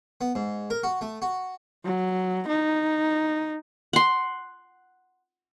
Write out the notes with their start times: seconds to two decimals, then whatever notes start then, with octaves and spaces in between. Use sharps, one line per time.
0.21 B3
0.35 G#2
0.70 A#4
0.83 F#4
1.01 A3
1.22 F#4
1.85 F#3
2.48 D#4
3.93 F#5 C6